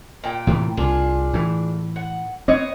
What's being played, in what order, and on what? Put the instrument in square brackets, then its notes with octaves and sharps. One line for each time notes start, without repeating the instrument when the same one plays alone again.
[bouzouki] A#2 G5
[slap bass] A2 C3 E3
[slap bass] C2 [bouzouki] D4 F4 G#4
[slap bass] A2 E3
[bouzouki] F#5
[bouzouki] B3 C#5 D#5 [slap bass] C4